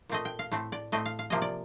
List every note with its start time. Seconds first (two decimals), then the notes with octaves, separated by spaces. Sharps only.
0.09 A#2 A3 C4 D#5
0.25 G5
0.39 F5
0.52 A2 A3 C4
0.72 D5
0.92 A2 A3 C4 D#5
1.06 F5
1.19 F5
1.30 C3 F3 A#3 D#5
1.42 D5